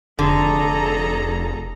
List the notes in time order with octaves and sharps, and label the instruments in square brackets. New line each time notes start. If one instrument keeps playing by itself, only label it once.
[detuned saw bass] F1 [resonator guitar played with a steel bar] D3 [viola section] G#4 A4 A#5